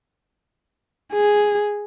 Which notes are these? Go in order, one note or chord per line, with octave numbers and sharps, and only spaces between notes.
G#4